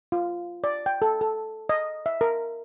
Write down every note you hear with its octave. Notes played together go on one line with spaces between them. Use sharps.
F4
D5
G5
A4
A4
D#5
E5
A#4